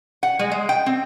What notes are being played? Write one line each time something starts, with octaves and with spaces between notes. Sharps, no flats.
F#5
G#3
G#3
G5
C4